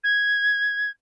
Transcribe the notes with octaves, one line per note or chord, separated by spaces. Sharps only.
G#6